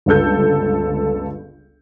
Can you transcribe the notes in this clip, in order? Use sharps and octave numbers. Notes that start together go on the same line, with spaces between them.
G1 C#2 A4 G6